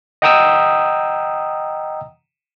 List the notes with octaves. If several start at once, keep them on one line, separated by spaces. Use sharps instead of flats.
D#5 F#5 G5 A#5 D#6 E6